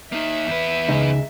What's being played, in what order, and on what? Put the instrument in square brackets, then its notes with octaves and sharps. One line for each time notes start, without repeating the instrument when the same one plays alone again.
[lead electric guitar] A#3 D#4 [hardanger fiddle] E5
[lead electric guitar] E2 B4
[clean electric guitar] C#2 G#3 D#4